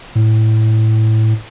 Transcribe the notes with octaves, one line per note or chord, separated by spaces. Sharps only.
A2